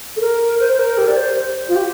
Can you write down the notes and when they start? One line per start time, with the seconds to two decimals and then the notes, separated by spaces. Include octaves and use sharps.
0.16 A4
0.20 A#4
0.60 C5
0.73 C5
0.79 A#4
0.98 G4
1.07 D5
1.17 C5
1.68 F4
1.75 G4